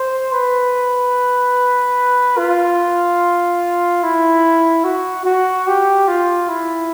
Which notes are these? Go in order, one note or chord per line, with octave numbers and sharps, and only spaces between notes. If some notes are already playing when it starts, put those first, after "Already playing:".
Already playing: C5
B4
F4
E4
F#4
F#4
G4
F4
E4